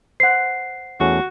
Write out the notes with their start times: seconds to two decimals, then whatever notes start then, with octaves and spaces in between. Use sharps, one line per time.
0.20 C5 F#5 C7
1.00 E2 A3 C#4 F#4